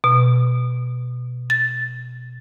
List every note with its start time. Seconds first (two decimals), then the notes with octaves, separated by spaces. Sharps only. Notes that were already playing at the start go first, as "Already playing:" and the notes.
0.04 B2
1.50 A6